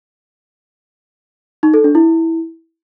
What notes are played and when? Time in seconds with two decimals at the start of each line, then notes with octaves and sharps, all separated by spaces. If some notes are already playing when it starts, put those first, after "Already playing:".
1.63 D#4
1.74 A4
1.84 D4
1.95 E4